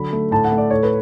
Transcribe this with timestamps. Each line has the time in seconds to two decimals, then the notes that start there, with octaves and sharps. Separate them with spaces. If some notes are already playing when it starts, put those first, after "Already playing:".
Already playing: D3 F#3 B5
0.13 A3
0.31 A2 A5
0.45 F#5
0.52 A3
0.58 D5
0.71 A2 C#5
0.83 B4